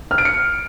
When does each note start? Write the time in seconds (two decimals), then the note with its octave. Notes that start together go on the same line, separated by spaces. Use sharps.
0.11 F6
0.18 D7
0.25 C#7